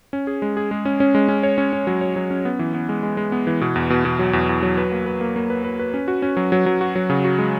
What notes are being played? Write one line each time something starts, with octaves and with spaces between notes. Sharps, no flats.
C#4
G#4
G#3
G#4
G#3
C#4
C#4
G#3
C#4
C#5
C#4
C#4
F#3
C#5
F#3
C#4
B3
E3
B3
G#3
G#3
G#3
B3
E3
B2
E2
B2
B2
F#3
E2
E2
F#3
B4
A#3
B4
A#3
A#3
B4
B4
B4
C#4
F#4
C#4
F#3
F#3
F#3
F#4
F#3
C#3
F#4
G#3